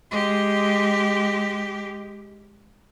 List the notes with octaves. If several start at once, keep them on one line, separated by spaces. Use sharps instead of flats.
G#3 G4